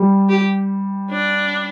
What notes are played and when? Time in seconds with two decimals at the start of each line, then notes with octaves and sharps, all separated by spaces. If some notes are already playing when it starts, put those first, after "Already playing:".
Already playing: G3
0.29 G4
1.11 D4